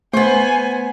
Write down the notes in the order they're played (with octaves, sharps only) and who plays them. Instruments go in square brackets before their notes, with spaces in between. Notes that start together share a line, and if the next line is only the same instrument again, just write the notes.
[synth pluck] A3 [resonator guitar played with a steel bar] B3 C5 [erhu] G#5